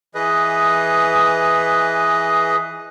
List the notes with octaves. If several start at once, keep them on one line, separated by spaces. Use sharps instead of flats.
E3 G#4 B4 D#5